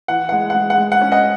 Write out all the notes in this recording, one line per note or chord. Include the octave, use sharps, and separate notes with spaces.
E3 F#5
G#3 F#5
G#3 F#5
F#5
G#3
F#5
C#4
D#5 F#5